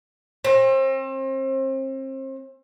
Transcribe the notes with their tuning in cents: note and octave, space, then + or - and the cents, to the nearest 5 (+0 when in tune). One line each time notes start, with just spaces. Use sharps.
C4 +35